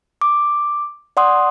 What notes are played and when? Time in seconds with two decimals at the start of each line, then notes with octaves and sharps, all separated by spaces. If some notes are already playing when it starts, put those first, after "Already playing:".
0.21 D6
1.17 D5 F#5 C6 D#6